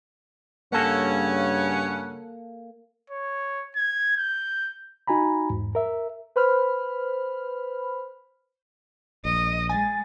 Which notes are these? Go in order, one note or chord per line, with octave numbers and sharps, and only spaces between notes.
G2 C#3 A#3 C#4 A4 F#5
C#5
G#6
G6
D#4 F#4 G#5 A#5 B5
E2 G#2
A#4 E5
B4 C5 B5 F6
A#1 D#5
G#3 G#5 A6